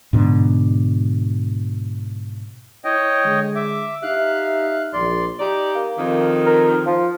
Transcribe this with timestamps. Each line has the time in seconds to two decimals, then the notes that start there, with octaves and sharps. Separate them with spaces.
0.13 G#2 B2 D3
2.85 E4 C#5 D#5 G5
3.24 D3 G#3
3.55 E5 D6
4.03 D#4 G4 E5 F5 F#6
4.93 A#1 D5 C6
5.40 D#4 G4 D5
5.76 A#3
5.98 F2 D#3
6.47 A#4
6.86 F3